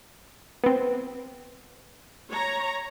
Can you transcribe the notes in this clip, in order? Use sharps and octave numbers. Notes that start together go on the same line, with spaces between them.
B3 C4
C#5 A#5